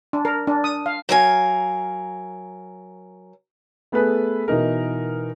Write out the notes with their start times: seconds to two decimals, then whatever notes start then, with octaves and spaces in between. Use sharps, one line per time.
0.13 D4
0.25 A#4
0.47 D4
0.64 D#6
0.86 F5
1.09 F#3 A#4 F5 G#5
3.92 A3 B3 G#4 A4 B4
4.48 B2 E3 D#4 A#4